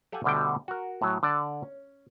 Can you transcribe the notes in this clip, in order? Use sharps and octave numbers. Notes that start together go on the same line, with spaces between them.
G4 A4 F5 F#5 G#5
D2 B2 D3 G3 G5
F#4 A#4
A2 F#3
D3 D5 A5
C#4